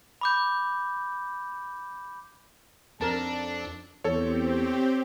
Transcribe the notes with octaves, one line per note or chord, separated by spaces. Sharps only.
B5 D6 G6
F2 D4 A4 A#4 A5
E2 C4 G4 A4 C#5